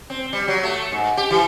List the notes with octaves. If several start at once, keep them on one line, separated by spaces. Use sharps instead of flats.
C4
G3
F#3
A3
G#2
G4
E3